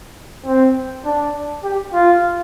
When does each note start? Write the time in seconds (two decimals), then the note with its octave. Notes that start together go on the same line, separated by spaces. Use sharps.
0.46 C4
1.05 D4
1.63 G4
1.93 F4